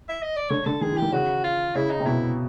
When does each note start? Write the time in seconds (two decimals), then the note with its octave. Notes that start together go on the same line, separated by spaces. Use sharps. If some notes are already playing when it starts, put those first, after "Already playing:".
0.09 E5
0.23 D#5
0.36 D5
0.50 D3 C#5
0.66 D3 A4
0.81 D#3 G#4
0.92 E3
0.97 D#3 G4
1.12 C#3 F#4
1.44 F4
1.75 C#3 E4
1.91 D#4
2.00 C3
2.06 B2 E4